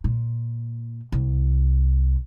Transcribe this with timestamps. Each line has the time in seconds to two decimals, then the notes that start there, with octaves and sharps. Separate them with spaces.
0.04 A#2
1.12 C2